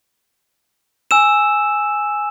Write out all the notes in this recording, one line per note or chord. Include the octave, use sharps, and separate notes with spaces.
G#5 E6 E7